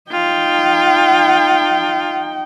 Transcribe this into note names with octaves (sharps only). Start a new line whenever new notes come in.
D#4 F4 G5